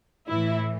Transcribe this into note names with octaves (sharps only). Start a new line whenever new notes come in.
A2 E3 E4